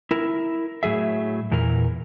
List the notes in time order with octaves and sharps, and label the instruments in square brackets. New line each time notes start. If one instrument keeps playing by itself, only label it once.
[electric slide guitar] E4 A#4
A2 F#3 G#4 E5
E2 A#2 E3 A#4